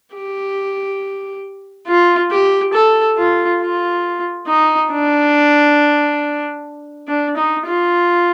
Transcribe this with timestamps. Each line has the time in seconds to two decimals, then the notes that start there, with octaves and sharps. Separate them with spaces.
0.14 G4
1.87 F4
2.31 G4
2.73 A4
3.18 F4
3.61 F4
4.47 D#4
4.91 D4
7.08 D4
7.37 D#4
7.66 F4